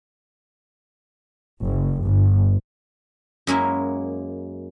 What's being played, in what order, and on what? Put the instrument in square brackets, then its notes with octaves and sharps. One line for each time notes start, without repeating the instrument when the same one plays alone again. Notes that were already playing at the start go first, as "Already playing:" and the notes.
[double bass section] F#1
G1
[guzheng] F#2 G#3 A#3 E4